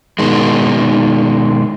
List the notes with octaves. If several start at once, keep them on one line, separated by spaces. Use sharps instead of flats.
B2 D#3 G#3